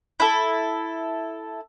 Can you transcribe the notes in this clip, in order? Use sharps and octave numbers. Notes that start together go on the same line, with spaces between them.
E4 A4